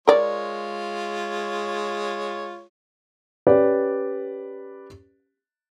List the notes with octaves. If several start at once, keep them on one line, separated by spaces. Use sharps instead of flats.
G#3 F4 A#4 C#5 D5
C#4 G4 B4 D5